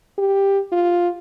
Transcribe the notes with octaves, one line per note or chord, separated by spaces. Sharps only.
G4
F4